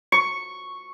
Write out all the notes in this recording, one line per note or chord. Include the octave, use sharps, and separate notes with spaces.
C#6